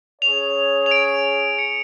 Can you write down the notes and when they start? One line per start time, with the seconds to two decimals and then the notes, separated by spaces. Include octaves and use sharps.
0.22 C#4 G#4 C#5 F7
0.86 F7
0.91 D7
1.59 C#7